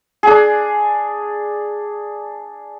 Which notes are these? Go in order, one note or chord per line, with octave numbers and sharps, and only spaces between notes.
D4 G#4